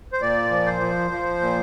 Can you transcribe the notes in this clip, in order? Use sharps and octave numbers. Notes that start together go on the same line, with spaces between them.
C5
A#2 D5
F3
C5
F3
F3
A#2